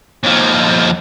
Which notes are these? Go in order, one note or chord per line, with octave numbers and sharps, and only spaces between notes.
D#2 F3